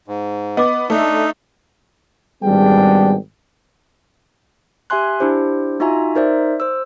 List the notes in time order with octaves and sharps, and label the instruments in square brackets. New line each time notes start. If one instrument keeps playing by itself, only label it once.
[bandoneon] G#2
[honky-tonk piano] B3 [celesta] D#5 D6
[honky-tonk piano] A3 [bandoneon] D4 [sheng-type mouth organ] D#4 [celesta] E5
[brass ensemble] G#1 G3 B3 D4 G#4 G5
[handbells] G4 E5 G#5 C6 F#6
D4 E4 G4 C5
D#4 F4 F#4 E5 G#5 A#5
D#4 A#4 C5 D5 E5
C5 E6